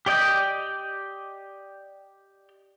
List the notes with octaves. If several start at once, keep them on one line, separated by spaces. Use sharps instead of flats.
G4 D5 D#5 G5